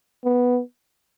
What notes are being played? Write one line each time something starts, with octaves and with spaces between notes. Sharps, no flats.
B3